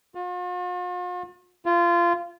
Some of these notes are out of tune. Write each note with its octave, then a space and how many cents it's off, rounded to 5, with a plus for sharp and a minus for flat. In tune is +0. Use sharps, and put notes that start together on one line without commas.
F4 +45
F4 -20